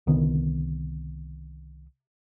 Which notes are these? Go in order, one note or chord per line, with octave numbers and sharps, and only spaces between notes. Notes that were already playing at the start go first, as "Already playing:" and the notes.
C2 D3 D#3 B3